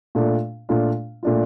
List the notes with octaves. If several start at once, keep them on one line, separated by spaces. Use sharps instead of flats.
A#2 A3 D4 F4
A#2 A3 D4 F4
A#2 A3 D4 F4